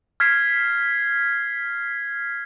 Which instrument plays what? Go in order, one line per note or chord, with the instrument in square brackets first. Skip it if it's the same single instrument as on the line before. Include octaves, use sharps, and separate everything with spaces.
[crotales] F6 G#6 B6 C7